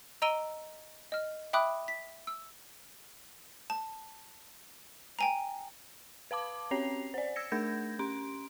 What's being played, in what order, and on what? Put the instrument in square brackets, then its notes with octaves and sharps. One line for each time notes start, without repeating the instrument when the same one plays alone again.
[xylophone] D#5 A#5 E6 D7 D#7 G7
D#5 F6
E5 G5 B5 D6 D#6 F#6
B6
E6
A5
G5 G#5 A#5
[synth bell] B4 F5 A5 D6
C4 C#4 C#5 C7 F7
C5 D5
E6 G#6 A#6 C#7
A3 D4 A#4 G6 G#6 A#6
C#4 C6 D7